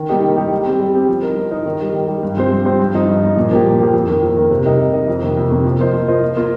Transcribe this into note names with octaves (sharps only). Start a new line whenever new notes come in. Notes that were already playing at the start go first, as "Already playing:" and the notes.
Already playing: D#3
G3 A#3 D#4 G4
D#3
G3 A#3 D#4 G4
G3
C4 G4
G3
C4 G4
F3
D#4 A#4
F3
D#4 A#4
D#3
G3 D#4
D#3
G3 D#4
G2
F3 C4 G4 C5
G2
F3 C4 G4 C5
G2
F3 D#4
G2
F3 D#4
A#2
F3 A#3 G4
A#2
F3 A#3 G4
F2
D#3 A#3
F2
D#3 A#3
C3
G3 D#4 A#4 D#5
C3
G3 D#4 A#4 D#5
F2
C3 D#3 A#3
F2
C3 D#3 A#3
F3
A#3 F4 C5 D#5
F3
A#3 F4 C5 D#5
F3
A#3 F4 A#4